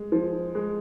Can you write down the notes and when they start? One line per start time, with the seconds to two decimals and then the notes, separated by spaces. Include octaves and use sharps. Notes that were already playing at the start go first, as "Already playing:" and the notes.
Already playing: G#3
0.12 F3
0.55 G#3